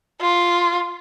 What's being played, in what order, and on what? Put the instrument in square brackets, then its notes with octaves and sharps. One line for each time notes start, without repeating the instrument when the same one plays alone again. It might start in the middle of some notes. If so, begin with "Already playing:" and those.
[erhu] F4